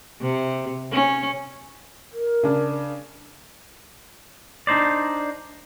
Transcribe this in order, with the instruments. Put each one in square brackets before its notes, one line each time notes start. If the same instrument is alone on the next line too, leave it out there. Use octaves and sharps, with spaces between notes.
[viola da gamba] C3
C#4
[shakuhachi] A#4
[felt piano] C#3 D4
[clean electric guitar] D4 D#4 C5 D5